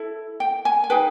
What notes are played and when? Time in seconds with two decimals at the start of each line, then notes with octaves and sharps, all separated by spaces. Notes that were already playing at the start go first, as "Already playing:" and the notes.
Already playing: E4 A4
0.40 G5
0.65 G#5
0.84 G#5
0.90 D#4 G#4 B4 G5